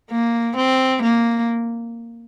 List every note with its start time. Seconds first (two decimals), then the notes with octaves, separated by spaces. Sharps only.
0.11 A#3
0.57 C4
1.03 A#3